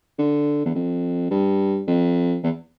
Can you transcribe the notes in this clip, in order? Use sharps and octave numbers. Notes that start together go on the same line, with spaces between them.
D3
E2
F2
G2
F2
E2